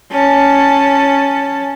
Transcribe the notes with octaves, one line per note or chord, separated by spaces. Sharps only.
C#4 A5